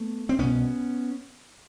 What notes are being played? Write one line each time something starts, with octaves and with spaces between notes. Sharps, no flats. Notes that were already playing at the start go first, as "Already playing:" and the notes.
Already playing: A3 B3
C4
C2 B2 B3 C#4